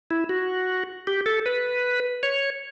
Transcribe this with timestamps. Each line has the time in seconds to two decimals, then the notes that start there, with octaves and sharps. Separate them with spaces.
0.11 E4
0.29 F#4
1.07 G4
1.26 A4
1.46 B4
2.23 C#5